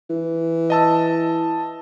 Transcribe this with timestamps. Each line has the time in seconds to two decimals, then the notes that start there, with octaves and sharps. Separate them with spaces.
0.10 E3
0.70 D#5 A5 E6